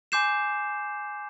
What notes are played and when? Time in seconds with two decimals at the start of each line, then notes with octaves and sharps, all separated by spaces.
0.12 G#5 C6 D6 G6 C7 E7